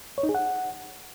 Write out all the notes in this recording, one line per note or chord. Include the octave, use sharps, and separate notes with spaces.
C#5
D#4
G#4
F#5